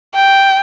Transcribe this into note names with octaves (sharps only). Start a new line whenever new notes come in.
G5